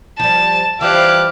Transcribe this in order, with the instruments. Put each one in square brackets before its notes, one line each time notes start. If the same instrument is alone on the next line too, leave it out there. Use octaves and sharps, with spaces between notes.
[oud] F3 G3 [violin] A5
[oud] E3 F3 G3 [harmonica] E4 G4 F5 [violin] D6 F#6